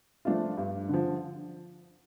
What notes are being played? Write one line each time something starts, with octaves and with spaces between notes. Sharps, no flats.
F3 A3 D4 F4
G2
D3 F3